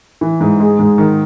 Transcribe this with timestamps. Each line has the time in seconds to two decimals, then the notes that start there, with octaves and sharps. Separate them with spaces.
0.21 E3
0.41 G#2
0.60 G#3
0.79 G#2
0.98 D#3